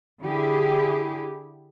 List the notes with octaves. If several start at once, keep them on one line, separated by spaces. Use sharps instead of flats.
D3 E4 G4 G#4